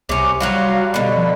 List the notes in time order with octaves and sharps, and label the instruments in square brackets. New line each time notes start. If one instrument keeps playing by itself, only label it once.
[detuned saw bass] C2 [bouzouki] C3 C#4 [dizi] D6
[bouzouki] F#3 F4 F#4 [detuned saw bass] G3 [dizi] F5
[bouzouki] B2 D3 [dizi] B5
[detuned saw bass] F3